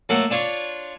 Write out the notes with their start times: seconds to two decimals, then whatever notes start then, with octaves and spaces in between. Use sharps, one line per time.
0.09 F#3 A3 A#3 F#5
0.31 D4 F4 C#5